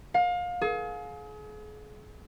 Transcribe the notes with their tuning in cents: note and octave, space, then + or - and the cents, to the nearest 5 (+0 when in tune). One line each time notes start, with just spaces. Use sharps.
F5 +30
G#4 +35